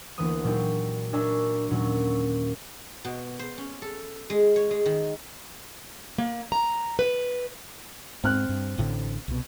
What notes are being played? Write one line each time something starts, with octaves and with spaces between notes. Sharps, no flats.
D2 E3 A#3 B3 D#6 D#7
A#2 F#3 D4 D#4 G4
D4 A#4 C#5 E5 G#5 A#5
D#2 A#2 F#3 C#4
B2
C5
C#4
A4
G#3
C#5
G#3
D#3
A#3
A#5
B4
G#2 C4 F6 F#6
G2
A1 A2 D3
C2 B2